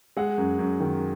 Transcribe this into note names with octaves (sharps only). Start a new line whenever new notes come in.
G#3 F#5
F#2
F#2
D#3